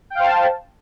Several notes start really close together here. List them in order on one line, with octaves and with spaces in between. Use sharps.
G5 F5 C5 A5